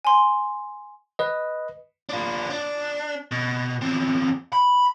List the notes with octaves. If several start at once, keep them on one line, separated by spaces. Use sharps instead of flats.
G#5 C6
B4 D#5
D4 F4
D4
B2
E2 C4
B5